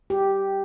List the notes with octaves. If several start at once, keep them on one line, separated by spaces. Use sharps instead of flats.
G4